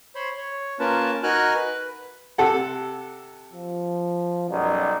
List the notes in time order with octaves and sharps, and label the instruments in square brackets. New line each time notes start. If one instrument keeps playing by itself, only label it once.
[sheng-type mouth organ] C5 C#5 B5 C6
C#5
A#3 C#4 F4 A#4 B4 A5
D#4 F#4 A#4 G#5 F6 F#6
B4
[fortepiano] C3 A4 F#5
[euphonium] F3
[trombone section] B1 G3 D#4 [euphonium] F#2